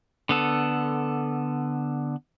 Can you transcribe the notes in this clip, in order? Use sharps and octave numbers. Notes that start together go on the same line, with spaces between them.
D3 B3 A4